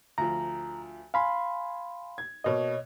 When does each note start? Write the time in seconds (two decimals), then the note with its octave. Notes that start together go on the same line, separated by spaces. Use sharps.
0.18 D2 F3 A#5
1.14 F5 G#5 B5 C6
2.18 G#6
2.44 B2 A#3 C#5 D#5